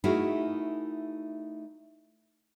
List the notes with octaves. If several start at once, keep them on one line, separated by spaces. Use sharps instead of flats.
A3 D#4 E4 F#4 G#4 A#4